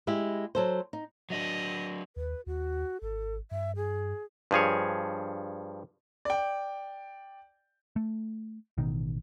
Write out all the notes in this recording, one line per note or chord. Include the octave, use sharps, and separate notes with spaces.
G#3 E4 G4
F#3 A4 C5
D#4
F#3 D4 D#5
D#2 B4
D#2 F#4
G#1 A4
G2 E5
G#4
G2 F3 G#4 C#5
D5 G5
A3
A1 B2 D#3